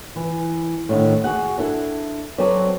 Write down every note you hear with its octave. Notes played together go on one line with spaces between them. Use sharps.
E3
A2 D3 D#3
F#4 G#4 F#5
D4 E4 A4
F#3 C4 A4 B4 D5